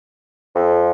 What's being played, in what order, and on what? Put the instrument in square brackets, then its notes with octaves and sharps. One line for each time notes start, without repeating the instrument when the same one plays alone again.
[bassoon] F2